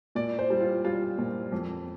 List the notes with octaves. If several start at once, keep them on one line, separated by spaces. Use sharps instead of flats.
A#2 D5
C5
G3
F4
G3 F4
A#2
F2